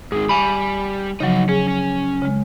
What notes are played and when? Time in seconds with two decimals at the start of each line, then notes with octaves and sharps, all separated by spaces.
0.12 G#2 D#3 G#4
0.29 G3 G#5 B5
1.20 C#3 F3 F#3 D#4 F#4
1.49 C#4 G#4
1.68 C#4
2.22 C#3 G#3